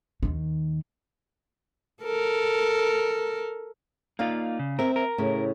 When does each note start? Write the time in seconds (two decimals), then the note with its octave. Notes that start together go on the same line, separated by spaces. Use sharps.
0.23 D#2 D#3
2.04 A4 A#4
4.19 A#3 D#4 F4 D5 F5
4.59 C#3
4.79 C4 A#4 E5
4.96 A#4
5.18 A2 C#3